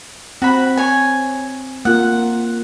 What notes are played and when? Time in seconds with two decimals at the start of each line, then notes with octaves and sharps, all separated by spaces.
0.42 C4 F#4 B5
0.77 C#5 G#5
1.85 A#3 F4 A#4 F#5